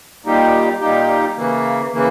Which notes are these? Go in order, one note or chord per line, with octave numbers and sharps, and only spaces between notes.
A#2 G3 A#3 D#4 G4
A#2 G3 A#3 D#4 G4
C#3 E3 A#3
C#3 E3 A#3